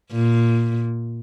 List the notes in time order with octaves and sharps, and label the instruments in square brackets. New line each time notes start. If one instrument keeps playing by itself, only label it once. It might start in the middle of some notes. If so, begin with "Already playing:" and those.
[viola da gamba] A#2